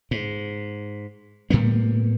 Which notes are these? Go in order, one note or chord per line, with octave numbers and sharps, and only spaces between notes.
G#2
A2 G3 A#3 B3